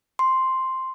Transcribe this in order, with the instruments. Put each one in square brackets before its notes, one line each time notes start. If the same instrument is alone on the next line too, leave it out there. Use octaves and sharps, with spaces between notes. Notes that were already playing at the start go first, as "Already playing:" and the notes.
[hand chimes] C6